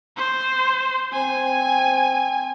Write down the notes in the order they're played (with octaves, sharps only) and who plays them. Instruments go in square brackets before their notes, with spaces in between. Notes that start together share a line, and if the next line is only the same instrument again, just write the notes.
[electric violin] C5
[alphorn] C4 [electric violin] G#5